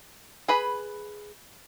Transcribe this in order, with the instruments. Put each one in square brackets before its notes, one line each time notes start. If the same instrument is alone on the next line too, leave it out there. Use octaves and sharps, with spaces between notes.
[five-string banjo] G#4 B4 B5